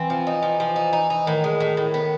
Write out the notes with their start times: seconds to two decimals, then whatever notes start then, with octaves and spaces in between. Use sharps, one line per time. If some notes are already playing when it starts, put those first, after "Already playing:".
Already playing: E3 C4
0.10 F3
0.27 D#4
0.43 F3
0.60 F3
0.76 D#4
0.93 D#4
1.10 D#4
1.27 A2 D#3
1.44 G#3
1.60 A2
1.77 A2
1.94 B3